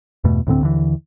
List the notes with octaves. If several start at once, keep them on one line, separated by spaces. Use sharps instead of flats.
E2 G2 B2 A3
D2 A2 D3 C4
D#2 D3 E3